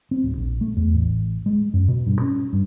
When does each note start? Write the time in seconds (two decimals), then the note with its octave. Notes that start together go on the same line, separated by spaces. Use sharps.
0.11 C4
0.24 D1
0.37 A#1
0.61 A3
0.76 E2
0.93 A1
1.46 G#3
1.74 F#2
1.88 B2
2.07 G2
2.21 C#4
2.53 G2